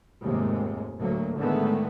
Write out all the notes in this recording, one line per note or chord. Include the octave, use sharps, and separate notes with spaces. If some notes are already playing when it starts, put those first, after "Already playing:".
F1 D#2 G#2 C3 G#3
D2 A2 F#3 A3 A#3
A2 D3 D#3 G#3 A3 B3